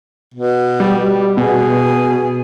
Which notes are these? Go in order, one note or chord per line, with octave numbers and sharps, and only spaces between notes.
B2
G3
B2 G#4